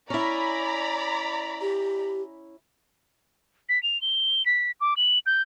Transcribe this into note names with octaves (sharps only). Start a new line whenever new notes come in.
C#4 E4 D5 A#5 B5
G4
B6
F7
G7
B6
D6
F#7
G6